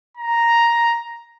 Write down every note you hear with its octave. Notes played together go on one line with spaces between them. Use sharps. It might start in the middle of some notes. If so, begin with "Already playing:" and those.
A#5